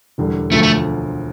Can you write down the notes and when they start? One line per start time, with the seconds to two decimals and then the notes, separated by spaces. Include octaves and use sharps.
0.18 E1 E2 D3 G3
0.52 E1 D2 D3 F3 A3
0.63 A3